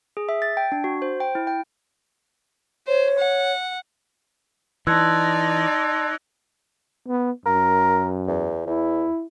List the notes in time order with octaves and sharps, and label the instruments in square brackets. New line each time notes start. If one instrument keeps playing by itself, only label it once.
[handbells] G#4
E5
A6
G5
D4
F#4
C5
G5
E4
G5
[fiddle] C5 [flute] C#5
[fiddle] F#5
[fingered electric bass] E3 [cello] D#4 D5 [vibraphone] A5 C6 [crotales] E6 F#6 G#6
[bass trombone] B3
[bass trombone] F#2 [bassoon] A#4
[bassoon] E2
[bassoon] E2 [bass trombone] E4